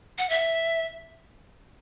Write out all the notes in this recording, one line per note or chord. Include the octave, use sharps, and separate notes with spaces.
F#5
E5